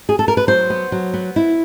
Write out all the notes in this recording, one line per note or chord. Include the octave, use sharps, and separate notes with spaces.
G#4
A4
A#4
B4
F#3 C5
B3
F#3
B3
E4